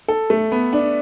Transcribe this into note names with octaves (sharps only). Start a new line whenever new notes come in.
A4
A3
B3
D4